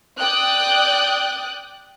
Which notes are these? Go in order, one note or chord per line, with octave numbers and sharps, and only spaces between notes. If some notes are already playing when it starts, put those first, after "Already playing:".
D5 G5 D#6 F#6